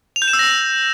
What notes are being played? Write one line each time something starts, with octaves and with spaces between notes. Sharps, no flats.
F7
G6
E7
E6
A#6